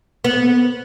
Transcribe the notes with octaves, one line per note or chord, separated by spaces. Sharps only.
B3